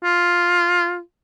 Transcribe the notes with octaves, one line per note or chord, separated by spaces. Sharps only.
F4